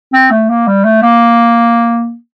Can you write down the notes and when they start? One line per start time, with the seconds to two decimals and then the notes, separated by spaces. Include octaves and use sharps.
0.13 C4
0.31 A3
0.50 A#3
0.68 G3
0.85 A3
1.03 A#3